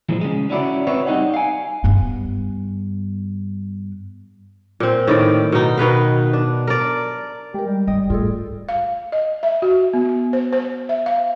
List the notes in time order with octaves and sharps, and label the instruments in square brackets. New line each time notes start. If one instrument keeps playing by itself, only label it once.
[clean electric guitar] A#2 E3 F3 G#3
C#3 G#3
C#4 D4 E4 F#4 A4 D5
C4 B4 C#5 D5 E5
G3 C4 D#4 D#5 F#5
F5 G#5
[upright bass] G2 B3
[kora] A#2 C4
A2 D#3 D5
B2 D#4
B2 D#3 B4 F5
D4
A#4 D5
[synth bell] G#3 A#4 [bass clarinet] G4
[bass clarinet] G3
[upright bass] G1 [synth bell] D#5 G5 D#6
[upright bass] A2 [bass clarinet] G3 [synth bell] F4 G#4 A4
[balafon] F5
D#5
E5
F#4
B3
C5
C5
E5
F5